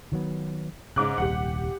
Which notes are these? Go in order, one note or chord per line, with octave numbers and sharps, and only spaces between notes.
D#3 F#3 B3
G#2 C#3 D6 F#6
D#1 C2 G4 F#5